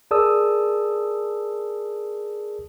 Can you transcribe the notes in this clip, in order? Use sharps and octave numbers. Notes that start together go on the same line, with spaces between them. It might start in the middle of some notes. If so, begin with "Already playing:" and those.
G#4 A#4 D5 A5 D#6 E6